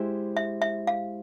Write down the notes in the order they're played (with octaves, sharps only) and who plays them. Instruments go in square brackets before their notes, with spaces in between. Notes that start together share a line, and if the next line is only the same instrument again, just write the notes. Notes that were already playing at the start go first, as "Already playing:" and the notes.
Already playing: [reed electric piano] G#3 E4 G4 C5
[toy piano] E5
E5
F5